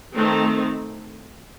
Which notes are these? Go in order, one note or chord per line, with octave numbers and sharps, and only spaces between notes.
D#3 A3 C4